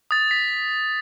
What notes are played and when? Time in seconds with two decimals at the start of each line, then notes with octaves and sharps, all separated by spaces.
0.11 D#6 A6
0.31 B6